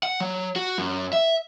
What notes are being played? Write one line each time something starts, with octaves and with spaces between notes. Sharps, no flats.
F#5
F#3
F#4
F#2
E5